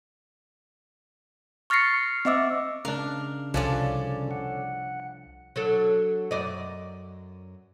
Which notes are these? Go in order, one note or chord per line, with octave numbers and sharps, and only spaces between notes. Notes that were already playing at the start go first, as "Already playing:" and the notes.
C#6 F6 A6 A#6 C7 C#7
C4 D#5 E5 D6 E6
C#3 D4 A#4 F5
C2 F3 C#4 D4 A4 D5
F#5
F#3 D4 A4
F#2 D5 D#5